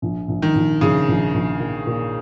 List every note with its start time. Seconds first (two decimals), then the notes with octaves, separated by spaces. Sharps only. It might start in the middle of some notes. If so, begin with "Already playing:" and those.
0.02 A#1
0.28 A#1
0.42 D#3
0.55 A#1
0.81 A#1 C#3
1.08 A#1
1.34 A#1
1.60 A#2
1.87 A#2